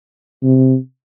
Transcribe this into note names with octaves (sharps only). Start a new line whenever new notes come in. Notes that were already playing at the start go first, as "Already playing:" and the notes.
C3